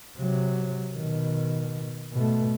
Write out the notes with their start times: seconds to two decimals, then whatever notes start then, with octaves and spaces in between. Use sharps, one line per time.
0.18 C3 F#3
0.96 B2 D#3
2.13 B2 A3